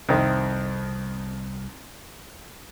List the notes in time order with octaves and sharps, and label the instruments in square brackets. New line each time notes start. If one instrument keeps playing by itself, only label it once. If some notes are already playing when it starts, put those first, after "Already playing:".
[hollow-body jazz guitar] C2 C5 E5 [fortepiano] F2 D#3